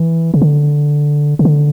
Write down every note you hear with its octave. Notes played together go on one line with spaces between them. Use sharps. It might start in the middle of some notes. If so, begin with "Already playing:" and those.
Already playing: E3
C#3
D3
C#3
D3